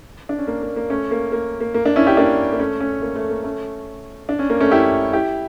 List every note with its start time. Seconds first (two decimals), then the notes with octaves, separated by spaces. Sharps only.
0.29 D4
0.39 C#4
0.47 A#3
0.62 A#3
0.76 A#3
0.90 A3 C#4
1.11 A#3
1.32 A#3
1.60 A#3
1.74 A#3
1.85 A#3 D4
1.96 C#4 E4
2.06 E4 G4
2.17 A#3 D4
2.52 A#3
2.60 A3 C#4
2.81 A3 C#4
3.02 A#3
3.16 A3
3.30 A#3
3.44 A3 C#4
4.29 D4
4.39 C#4
4.50 A#3
4.60 A3 C#4
4.71 E4 G4
5.13 E4 G4